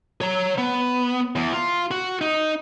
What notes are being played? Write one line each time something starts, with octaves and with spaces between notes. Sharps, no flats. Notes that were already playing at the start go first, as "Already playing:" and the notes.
C#5 A#5
B3
E2
F4
F#4
D#4